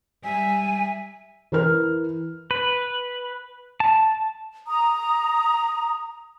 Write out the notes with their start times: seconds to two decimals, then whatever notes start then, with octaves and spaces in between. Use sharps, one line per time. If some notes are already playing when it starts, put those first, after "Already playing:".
0.24 G3 E5 G#5
1.52 E3 A#4 F6
2.51 B4
3.80 A5
4.68 A#5 D#6